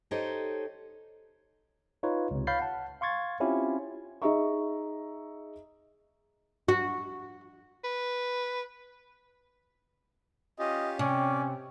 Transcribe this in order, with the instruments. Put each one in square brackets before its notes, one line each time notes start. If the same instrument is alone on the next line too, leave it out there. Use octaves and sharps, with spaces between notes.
[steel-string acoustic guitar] D#4 G4 A4 C5 C#5 D#5
[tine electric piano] D#4 F4 B4 C#5
C#2 C3
C#5 F5 B5 G6 A6 C7
F#5 A5
F5 C6 C#6 G#6 A6
C4 C#4 E4 F4 G4
[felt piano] D#4 G#4 D#5 E5 A#5 C#6
[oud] F#4
[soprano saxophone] B4
[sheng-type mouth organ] C#4 F4 G4 [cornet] D#5
[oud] C3 [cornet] C#4 [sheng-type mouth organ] D5